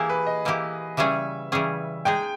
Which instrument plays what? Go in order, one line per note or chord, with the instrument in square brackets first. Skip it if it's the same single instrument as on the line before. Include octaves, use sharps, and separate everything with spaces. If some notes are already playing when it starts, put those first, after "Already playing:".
Already playing: [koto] E3 A#3 E4 G4 [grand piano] G#4
[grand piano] B4
D#5
[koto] E3 A#3 E4 G4
[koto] C#3 E3 G3 C#4 G#4 [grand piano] E5
[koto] C#3 E3 G3 C#4 G#4
[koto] G#3 D#4 G#4 [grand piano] G5